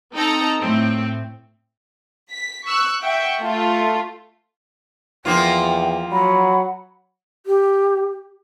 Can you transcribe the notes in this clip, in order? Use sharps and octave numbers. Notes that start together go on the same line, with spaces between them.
C4 D#4 A4 A#5
A2 C4
B6
C#6 E6 F#6
E5 F#5 G5 C#6
A3 F4
E2 F3 A#3 F4 G5
F#3 F#5 B5
G4